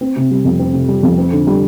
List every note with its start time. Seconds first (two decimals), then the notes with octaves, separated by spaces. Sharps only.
0.01 C4
0.16 C3
0.31 G3
0.45 F2
0.59 C4
0.73 C3
0.88 G3
1.03 F2
1.18 C4
1.32 D3
1.47 G3